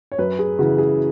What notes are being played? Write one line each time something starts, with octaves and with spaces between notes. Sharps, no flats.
C#5
F#2 B4
G#4
C#3 E3 F#4
G#4